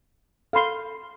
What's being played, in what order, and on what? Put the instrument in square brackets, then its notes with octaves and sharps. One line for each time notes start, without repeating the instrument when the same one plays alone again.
[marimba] A4 B5 [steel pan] F5 C6